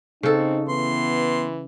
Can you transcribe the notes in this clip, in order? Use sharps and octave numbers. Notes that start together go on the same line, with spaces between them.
C#3 C4 D#4 A4
E3 B3 C6